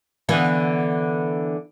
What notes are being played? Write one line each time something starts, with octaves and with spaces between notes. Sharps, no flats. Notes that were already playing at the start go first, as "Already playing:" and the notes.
D3 E3 B3